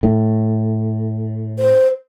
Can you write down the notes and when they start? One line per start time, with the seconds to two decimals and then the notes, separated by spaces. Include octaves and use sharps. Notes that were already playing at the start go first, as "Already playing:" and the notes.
0.03 A2
1.58 C5